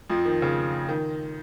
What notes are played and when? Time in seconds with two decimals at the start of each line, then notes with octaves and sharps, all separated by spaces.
0.10 F2 F3
0.25 D#3
0.42 C#3
0.88 D#3